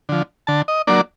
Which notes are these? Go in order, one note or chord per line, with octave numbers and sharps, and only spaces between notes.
D3 F3
D3 A5
D#5
F#3 A#3 D4 D5